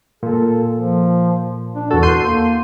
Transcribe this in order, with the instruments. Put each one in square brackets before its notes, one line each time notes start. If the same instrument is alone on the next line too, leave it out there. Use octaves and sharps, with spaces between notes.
[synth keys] A#2 [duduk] A4
[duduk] F3
D4
[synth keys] E2 A4 [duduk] F#4
[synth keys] C6 G6 D#7
[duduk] A#3